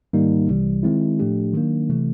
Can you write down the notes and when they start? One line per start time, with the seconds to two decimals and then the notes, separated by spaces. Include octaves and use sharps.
0.13 G#2 D#3 G3 A#3 D#4
0.48 C2 C3 E3 G3
0.83 D#3 G#3 C4 E4
1.19 A2 F3 A3 D4 G4
1.54 D#3 F#3 A#3 D4
1.89 C3 E3 A3